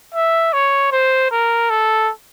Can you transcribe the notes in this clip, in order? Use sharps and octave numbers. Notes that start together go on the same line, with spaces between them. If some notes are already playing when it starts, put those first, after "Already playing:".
E5
C#5
C5
A#4
A4